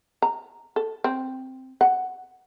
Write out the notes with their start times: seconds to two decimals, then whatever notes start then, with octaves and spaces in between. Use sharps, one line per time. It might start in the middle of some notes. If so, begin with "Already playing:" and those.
0.22 A#5
0.76 A4
1.04 C4
1.81 F#5